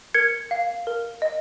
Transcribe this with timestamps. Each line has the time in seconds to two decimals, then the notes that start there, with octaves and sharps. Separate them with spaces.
0.14 A#4 G#6 C#7
0.51 F5
0.87 A#4
1.22 D#5